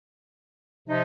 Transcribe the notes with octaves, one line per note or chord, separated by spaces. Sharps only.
C3 F3 D#4